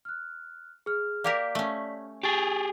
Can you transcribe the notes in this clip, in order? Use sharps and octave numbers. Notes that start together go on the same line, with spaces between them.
F6 F#6
G#4 F6
A#3 G4 A#4 D5 B6
A3 C#4
G4 G#4 C#6 A6